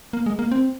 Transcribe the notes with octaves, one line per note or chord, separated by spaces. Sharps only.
A#3
G#3
A#3
C4